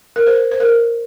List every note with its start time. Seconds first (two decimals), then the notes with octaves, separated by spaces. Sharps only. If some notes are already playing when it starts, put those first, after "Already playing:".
0.16 A#4
0.27 C5
0.51 C5
0.60 A#4